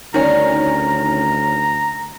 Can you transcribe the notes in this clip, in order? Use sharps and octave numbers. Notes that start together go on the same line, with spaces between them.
D2 D#3 G3 C#4 A#5